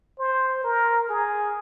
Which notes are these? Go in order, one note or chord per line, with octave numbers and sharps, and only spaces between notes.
C5
A#4
G#4